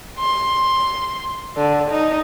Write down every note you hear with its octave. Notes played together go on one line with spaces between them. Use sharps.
C6
D3
D#4